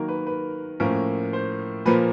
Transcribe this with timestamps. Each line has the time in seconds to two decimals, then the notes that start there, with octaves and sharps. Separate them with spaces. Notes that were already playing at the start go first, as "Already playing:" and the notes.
Already playing: D#3 F#3 A#3 A#4
0.08 B4
0.27 B4
0.80 A2 F3 A#3 C#4 A#4
1.33 C5
1.85 A#2 F3 A#3 B4